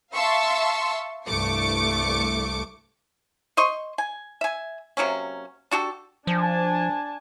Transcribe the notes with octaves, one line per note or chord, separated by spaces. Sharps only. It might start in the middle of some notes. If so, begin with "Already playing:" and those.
E5 F5 A5 C6 C#6 E6
C2 G2 A3 C#6 D6 C#7
C5 D#5 C6 C#6
G#5
E5 G#5
C3 F#3 A#3 C#4
D4 F#4 G4 A4
F3 D4 G#5 A5